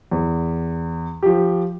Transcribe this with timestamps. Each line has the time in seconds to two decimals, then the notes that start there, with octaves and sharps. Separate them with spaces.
0.11 E2
1.23 F3 G4